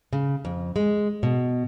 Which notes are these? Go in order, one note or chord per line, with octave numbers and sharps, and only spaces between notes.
C#3
F2
G#3
B2